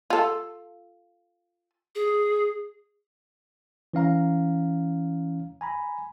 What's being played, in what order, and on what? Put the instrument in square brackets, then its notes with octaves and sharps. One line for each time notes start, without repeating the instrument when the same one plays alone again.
[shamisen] F4 A4
[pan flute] G#4
[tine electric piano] E3 C#4 F5 A#5
G#5 A#5 B5